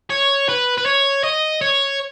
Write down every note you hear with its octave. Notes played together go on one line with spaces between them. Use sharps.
C#5
B4
B4
C#5
D#5
C#5